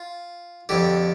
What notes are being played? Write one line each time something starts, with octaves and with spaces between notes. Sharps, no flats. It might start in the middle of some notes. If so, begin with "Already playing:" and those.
Already playing: F4
F2 D3 G4